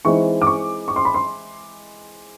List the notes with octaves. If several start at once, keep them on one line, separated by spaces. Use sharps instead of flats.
E3 G#3 C4 D#4 C#6
D6
C#6
C#6
C6
B5
C6